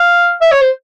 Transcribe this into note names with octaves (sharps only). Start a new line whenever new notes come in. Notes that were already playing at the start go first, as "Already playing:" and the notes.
Already playing: F5
E5
C#5
C5